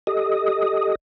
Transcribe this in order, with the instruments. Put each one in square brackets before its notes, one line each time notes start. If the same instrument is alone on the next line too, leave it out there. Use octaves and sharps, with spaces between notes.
[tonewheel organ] G4 A4 D#5 D#6